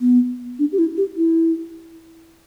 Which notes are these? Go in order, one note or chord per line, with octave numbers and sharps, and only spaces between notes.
B3
D4
G4
E4
G4
E4